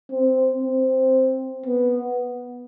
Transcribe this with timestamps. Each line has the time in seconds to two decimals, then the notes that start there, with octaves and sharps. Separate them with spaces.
0.11 C4
0.63 C4
1.66 B3